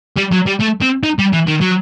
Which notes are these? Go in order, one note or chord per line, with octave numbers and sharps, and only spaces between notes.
G3
F#3
G3
A3
C4
D#4
G3
E3
D#3
F#3